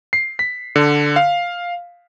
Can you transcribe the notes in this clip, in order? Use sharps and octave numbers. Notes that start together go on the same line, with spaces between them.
C7
B6
D3
F5